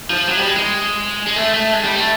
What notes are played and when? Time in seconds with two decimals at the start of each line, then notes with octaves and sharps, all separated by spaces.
0.10 F3
0.29 F#3
0.37 G3
0.46 G#3
0.56 G#3
1.27 G#3
1.36 A3
1.54 A3
1.73 G#3
1.84 G3
1.96 A3